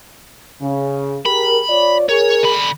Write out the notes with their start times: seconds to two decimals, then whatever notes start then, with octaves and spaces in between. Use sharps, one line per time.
0.61 C#3
1.26 G4 G#4 A#4 B5
1.69 F4 C#5 D5
2.09 G#4 A#4 C#5
2.43 D3 B5